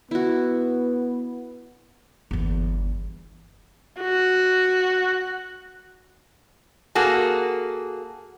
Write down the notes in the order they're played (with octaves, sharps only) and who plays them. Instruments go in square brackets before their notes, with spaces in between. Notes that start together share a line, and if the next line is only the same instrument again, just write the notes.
[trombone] B3 [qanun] E4 F#4
[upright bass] G1 E2
[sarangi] F#4
[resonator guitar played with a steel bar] A#3 F#4 G#4 A4